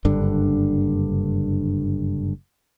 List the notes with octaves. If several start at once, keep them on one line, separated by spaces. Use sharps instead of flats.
F#1 G2 D3 D4